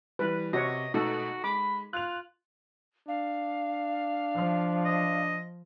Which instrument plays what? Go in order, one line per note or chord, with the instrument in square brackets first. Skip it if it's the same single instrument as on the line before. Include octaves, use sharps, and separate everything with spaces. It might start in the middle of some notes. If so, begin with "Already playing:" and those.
[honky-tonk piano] E3 G3 [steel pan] B4
[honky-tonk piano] C3 [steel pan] F#4 C#5 [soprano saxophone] D#5
[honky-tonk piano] B2 A3 [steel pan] D#4 A4 [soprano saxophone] F#4
[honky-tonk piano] G#3 [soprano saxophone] B5 [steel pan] D6
[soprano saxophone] F4 [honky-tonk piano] F#6 F7
[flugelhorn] D4 [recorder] F5
[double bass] F3
[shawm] D#5